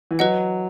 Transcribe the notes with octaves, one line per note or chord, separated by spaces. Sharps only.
E3
F#3 B4 D#5 F#5